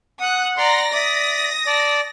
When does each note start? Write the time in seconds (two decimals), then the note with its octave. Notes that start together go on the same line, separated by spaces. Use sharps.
0.19 F#5 D#6 F#6
0.57 D5 A#5 C6 A#6
0.93 D5 E5 D#6
1.66 D5 A5